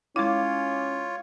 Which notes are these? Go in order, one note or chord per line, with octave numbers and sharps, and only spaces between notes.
G#3 C#4 E4 F4 C#5 F5 D6